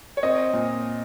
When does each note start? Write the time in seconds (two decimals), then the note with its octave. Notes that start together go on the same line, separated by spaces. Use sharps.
0.17 C#5
0.23 C4 D#5
0.53 A#2